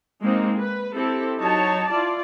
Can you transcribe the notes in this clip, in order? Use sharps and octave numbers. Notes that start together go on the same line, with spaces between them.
G#3 A#3 C4 D#4
B4
C4 E4 G4 A4
F#3 D#4 C#5 A5
E4 F4 D5